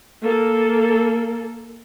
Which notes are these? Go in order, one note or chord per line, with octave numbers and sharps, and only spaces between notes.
A#3 A4